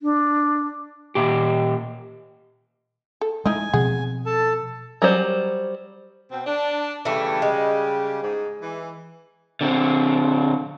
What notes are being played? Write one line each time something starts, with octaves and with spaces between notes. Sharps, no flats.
D4
A#2 G4
A4
G#3 D#4 E4 D#5 G#5
B2 F3 C4 G#4 F#5
A4 A5
F#3 G3 C5
B2 C4
D4
C#3 E3 G3 A3 G4
G#3
G#2
E3
D3 C4